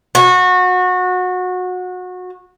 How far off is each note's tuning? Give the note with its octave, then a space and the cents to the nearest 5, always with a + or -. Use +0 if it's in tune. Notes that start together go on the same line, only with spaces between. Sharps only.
F#4 -25